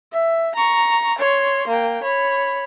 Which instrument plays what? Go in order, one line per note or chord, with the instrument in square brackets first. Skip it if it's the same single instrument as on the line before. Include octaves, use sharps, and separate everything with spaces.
[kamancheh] E5
A#5 C#6
C#5 C6
A#3 G5
C#5 B5